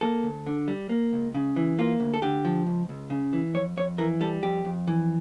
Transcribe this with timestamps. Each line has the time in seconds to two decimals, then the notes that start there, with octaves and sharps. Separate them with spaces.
0.01 A#3 A4
0.23 D2
0.46 D3
0.68 G3
0.89 A#3
1.13 C#2
1.35 C#3
1.56 E3
1.79 A#3 F4
2.00 D2
2.14 A4
2.22 D3 G4
2.45 F3
2.66 C#2
2.89 C#2
3.10 C#3
3.33 E3
3.54 F2 C#5
3.77 F2 C#5
3.98 E3 A#4
4.21 G3 A4
4.43 F2 G4
4.65 F2
4.87 E3